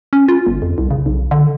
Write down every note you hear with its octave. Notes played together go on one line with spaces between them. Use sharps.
C#4
F4
G1
F2
C2
C#3
B1
D3